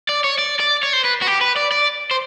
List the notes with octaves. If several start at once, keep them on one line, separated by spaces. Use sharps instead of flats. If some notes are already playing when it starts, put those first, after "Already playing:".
D5
C#5
D5
D5
C#5
C5
B4
F#4
G4
B4
D5
D5
C5